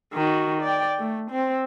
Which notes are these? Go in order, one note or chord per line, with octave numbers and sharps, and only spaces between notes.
D#3 F#4
D5 G5
A3
C4